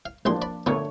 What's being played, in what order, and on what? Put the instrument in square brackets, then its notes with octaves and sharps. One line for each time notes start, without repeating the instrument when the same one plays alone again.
[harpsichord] F5
[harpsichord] A1 G#3 C6 [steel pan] F3 A#3 D4
[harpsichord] D5 B5
[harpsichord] A#2 B3 [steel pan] D3 A3 C#5